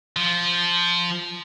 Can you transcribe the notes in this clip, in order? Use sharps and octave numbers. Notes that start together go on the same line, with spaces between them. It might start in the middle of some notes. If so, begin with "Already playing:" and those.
F3